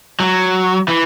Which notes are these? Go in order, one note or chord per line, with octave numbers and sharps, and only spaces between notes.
F#3
E3